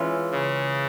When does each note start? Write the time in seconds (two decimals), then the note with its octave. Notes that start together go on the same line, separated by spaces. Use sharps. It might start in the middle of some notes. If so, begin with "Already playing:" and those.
Already playing: E3 G#3 C#4 F4
0.31 C#3